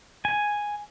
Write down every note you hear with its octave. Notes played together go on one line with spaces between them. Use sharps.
G#5